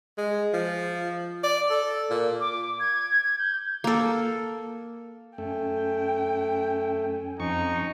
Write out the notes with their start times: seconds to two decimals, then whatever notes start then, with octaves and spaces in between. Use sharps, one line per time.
0.18 G#3
0.54 F3
1.44 D5
1.70 A4
2.10 A#2
2.40 D6
2.80 G#6
3.24 G#6
3.39 G6
3.84 A#3 A4
5.38 F#2 A3 C#4 G5 G#5
7.40 F2 D#4 C#6